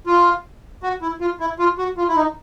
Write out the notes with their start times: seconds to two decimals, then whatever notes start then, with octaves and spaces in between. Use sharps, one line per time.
0.06 F4
0.83 F#4
1.02 E4
1.21 F4
1.40 E4
1.59 F4
1.78 F#4
1.97 F4
2.09 E4
2.17 D#4